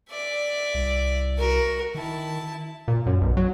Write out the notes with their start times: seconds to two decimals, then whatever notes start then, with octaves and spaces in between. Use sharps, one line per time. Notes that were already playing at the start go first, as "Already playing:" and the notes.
0.10 D5 E5
0.74 C2
1.38 F#4 A#4
1.95 D#3 E4 A5
2.88 A#2
3.06 F#2
3.21 B1
3.37 F#3